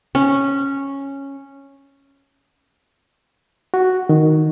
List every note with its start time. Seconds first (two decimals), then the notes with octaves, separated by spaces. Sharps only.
0.15 C#4
3.74 F#4
4.09 D#3